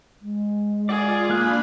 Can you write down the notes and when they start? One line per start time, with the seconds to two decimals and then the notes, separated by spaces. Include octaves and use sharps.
0.22 G#3
0.89 F4 G#4 D5
1.30 A#3 D4 F5 B5 F#6